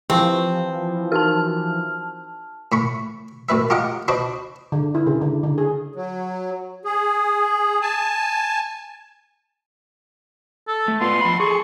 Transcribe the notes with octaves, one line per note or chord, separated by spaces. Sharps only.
E3 F3 C4 G4
D#4 F#4 A#4 A5 F6
A2 B5 C#6
F#2 A2 B4 E5
F4 G4 A#4 D#5 F#5
D4 F#4 B4 C5 D#5
D3
E4
C#3
D3
D3
G#4
F#3
G#4
G#5 A5
A4
A3
B3 F4 C6
F3 B5
G#4 A4 C#6